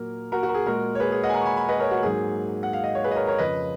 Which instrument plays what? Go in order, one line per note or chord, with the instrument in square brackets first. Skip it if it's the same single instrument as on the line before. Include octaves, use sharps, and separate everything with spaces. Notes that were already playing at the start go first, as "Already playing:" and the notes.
Already playing: [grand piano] A#2 F#3 A#3 A#4
F#4 A#4
F#4
A#4
G#4
A#2 G#3 F#4 A#4
C#5
G#4 B4
G#4
D#5 F#5
G#5
F#5 A#5
C#6
G#5 B5
G#5 B5
B4 D#5
A#4 C#5
F#4
G#2 F#3 A#3 G#4
F#5
F5
D#5
C#5
G#4 B4
D#5
A#4 C#5
A#4 C#5
F2 C#3 F3 B4 D#5